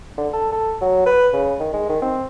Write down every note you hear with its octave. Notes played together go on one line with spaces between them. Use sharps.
D3
A4
A4
F#3
B4
C#3
D#3
G#3
D#3
C4